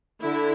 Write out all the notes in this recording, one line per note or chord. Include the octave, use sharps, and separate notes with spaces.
D3 E4